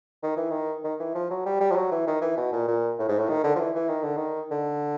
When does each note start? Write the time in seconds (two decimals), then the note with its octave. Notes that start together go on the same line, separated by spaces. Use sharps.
0.23 D#3
0.37 E3
0.51 D#3
0.84 D#3
1.00 E3
1.15 F3
1.30 F#3
1.46 G3
1.61 G3
1.71 F3
1.76 F#3
1.92 E3
2.07 D#3
2.22 E3
2.37 B2
2.52 A#2
2.68 A#2
2.99 A2
3.09 G#2
3.19 A2
3.29 D#3
3.44 D3
3.55 F3
3.60 E3
3.75 E3
3.89 D#3
4.03 D3
4.17 D#3
4.51 D3